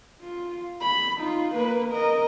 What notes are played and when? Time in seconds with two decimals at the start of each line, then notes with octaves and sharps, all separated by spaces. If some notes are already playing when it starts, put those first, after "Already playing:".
0.22 F4
0.81 B5
1.17 D#4 F4
1.55 A#3 B4
1.89 A#4 D#5